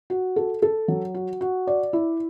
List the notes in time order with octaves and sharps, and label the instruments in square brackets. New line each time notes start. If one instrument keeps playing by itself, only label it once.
[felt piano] F#4
A4
A4
F#3
F#4
F#4
D5
E4